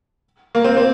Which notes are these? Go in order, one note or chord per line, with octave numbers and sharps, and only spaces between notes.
A#3
C4
C4